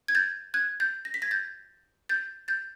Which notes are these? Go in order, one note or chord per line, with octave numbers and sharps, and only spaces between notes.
G#6
G6 A6
F#6 G#6
G6 A6
A#6
B6
G#6 A#6
G6 A6
G6 A6
G6 A6